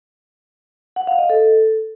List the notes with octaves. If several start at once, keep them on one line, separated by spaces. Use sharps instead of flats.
F#5
F5
D#5
A4